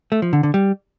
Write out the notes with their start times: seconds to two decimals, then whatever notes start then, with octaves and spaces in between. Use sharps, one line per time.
0.12 A3
0.22 F3
0.33 D3
0.43 D3
0.54 G3